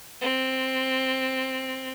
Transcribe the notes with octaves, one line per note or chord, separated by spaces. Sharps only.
C4